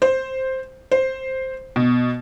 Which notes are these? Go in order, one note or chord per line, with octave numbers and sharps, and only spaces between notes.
C5
C5
B2